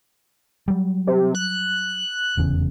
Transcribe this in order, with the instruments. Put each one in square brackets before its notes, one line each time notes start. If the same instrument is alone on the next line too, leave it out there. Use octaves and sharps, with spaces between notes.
[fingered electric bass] F#3 G3
[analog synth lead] C3
F#6
[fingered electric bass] F1 E2 C#3